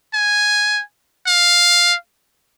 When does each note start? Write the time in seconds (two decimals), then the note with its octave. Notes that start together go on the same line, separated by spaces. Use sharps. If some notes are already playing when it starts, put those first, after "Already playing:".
0.14 G#5
1.27 F5